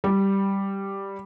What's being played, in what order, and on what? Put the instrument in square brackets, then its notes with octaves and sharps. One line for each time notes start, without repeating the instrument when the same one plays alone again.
[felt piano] G3